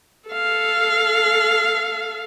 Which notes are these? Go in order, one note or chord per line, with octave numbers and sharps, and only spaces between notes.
A4 F5